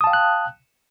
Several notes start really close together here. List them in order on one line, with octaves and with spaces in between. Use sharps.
D#6 A5 F5 G5 F#6